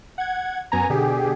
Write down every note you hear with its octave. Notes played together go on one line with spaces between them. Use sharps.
F#5 G#6
F#2 B3 G#5 A#5
B2 D3 G4 G#4